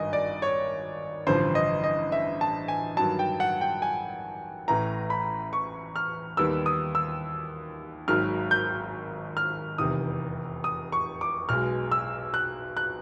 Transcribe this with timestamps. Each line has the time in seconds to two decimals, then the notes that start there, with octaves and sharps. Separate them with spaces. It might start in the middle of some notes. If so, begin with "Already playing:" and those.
Already playing: G#1 G2 D#3 D#5 G#5
0.13 D5
0.42 C#5
1.27 A1 G2 D3 F3 C5
1.55 D#5
1.84 D#5
2.12 E5
2.41 A5
2.68 G#5
2.97 G2 D#3 F#3 A5
3.19 G5
3.40 F#5
3.61 G5
3.82 G#5
4.68 A1 A2 E3 A#5
5.10 B5
5.53 C#6
5.96 F6
6.37 D#2 D#3 G3 B3 E6
6.66 D#6
6.95 E6
8.08 G#1 G#2 D#3 F#3 F6
8.51 G6
9.37 F6
9.78 F1 E2 C3 D#3 D#6
10.64 D#6
10.92 C#6
11.21 D6
11.49 B1 B2 G#3 F6
11.92 E6
12.34 F#6
12.77 F#6